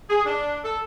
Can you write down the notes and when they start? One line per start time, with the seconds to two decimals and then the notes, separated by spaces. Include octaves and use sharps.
0.10 G#4
0.26 D4
0.64 A4